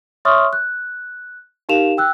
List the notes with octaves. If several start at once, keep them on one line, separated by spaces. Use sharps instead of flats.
C#5 E5 C6 C#6 D#6 F6
F#6
D#4 G4 A#4 F5 E7 F7
G5 E6 F#6